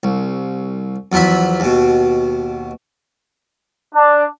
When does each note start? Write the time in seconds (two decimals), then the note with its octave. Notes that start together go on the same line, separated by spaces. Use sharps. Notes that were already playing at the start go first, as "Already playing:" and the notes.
0.03 C2
1.12 E2 F3 F#3 E4 B5
1.60 D#2 B2
3.94 D4